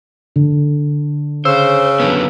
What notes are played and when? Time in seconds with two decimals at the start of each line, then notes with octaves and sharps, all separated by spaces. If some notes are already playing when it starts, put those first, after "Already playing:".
0.36 D3
1.45 C#3 C5 E6
2.00 F#2 D3 B3